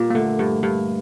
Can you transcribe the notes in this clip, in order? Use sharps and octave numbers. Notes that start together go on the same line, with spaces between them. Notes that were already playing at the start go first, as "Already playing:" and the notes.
Already playing: A#2 G3
A#3
D3 A3
G2
G2